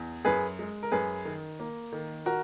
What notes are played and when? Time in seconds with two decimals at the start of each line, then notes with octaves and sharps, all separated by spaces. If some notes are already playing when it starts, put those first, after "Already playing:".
Already playing: E2
0.25 F#2 G#4 B4
0.59 G#3
0.83 A#4
0.92 F#2 G#4 B4
1.25 D#3
1.60 A#3
1.92 D#3
2.26 F#4 A#4